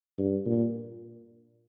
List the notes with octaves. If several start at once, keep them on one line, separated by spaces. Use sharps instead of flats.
G2
A#2